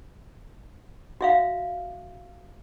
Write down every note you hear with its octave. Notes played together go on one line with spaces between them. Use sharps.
F#4 E5 F5